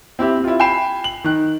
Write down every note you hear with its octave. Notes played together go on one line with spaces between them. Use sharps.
C4 E4 G4
E4 F4
G5 G#5 B5 C7 E7
F#7
D#3 F#6